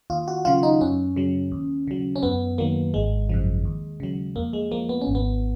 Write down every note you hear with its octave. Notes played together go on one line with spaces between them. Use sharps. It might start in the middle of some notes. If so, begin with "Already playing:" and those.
D#2 F4
F#4
C#3 F#3 F4
D#4
F#2 C#4
C#3 F#3
D#2
C#3 F#3
C#4
F#2 B3
D#3 F#3 A#3
G#1 G#3
F#2 C#3 F3
D#2
C#3 F#3
F2 A#3
G#3
F3 A#3
B3
C#4
G#1
B3